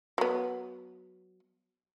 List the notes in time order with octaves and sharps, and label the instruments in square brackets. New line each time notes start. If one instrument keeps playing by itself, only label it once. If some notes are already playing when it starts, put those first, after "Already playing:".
[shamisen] F#3 B3